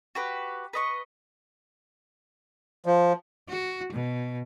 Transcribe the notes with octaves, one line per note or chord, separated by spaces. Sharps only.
F#4 G4 B4
B4 D#5 C#6
F3
F#4
B2